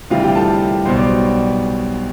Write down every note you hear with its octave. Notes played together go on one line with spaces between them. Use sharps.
D2 C3 E3 G3 F4 F5
G4 G5
A4 A5
B1 B2 G3 C5 C6
D5 D6